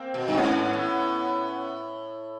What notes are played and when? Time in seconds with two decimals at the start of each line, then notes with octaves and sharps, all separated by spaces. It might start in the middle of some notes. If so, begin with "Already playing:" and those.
Already playing: A#3 C4
0.14 B2
0.28 G2
0.37 G#2 B3 C#4
0.73 A2